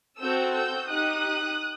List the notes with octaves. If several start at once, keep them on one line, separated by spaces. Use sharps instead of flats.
C4 F#4 A4 E6 G6
E6 G6
D#4 G4 D#6 F#6